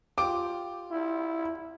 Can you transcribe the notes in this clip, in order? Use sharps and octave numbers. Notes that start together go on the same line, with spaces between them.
F4 G4 C5 D6
E4